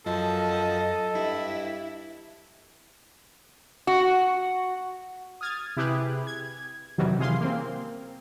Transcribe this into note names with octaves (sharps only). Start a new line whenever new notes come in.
F#2 F3 A4 D#5
G2 E4
F#4
D#6 F6 G#6 A6
C3 E4 G4 G#4 B4
G#6
F2 C3 D#3 E3 F#3 G3
C3 E3 G#4 F5 C6
A#3 C4